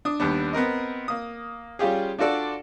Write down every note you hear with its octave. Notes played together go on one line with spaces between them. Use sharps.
D4 D#6
D#2 G3 B3 D4
B3 C4 A#4 D#5
A#3 D#6
G3 C#4 F4 G4 G#4
D4 F4 F#4 A4 D5